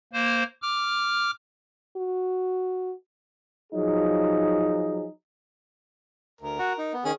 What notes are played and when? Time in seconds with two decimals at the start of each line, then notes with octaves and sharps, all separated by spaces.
0.13 A#3 C5
0.62 D6 F6
1.97 F#4
3.72 F3 F#3 D#4 G#4
6.41 D2 A#4
6.59 F#4
6.78 D#4
6.93 B3
7.05 D#3 C#4 G#4